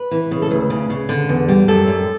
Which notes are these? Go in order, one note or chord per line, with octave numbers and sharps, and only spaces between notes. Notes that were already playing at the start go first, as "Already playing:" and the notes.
Already playing: B4
E3
C#3
A4
D2 B4
C#3
C#3
D3
E2
G3
F#2 A4
F#2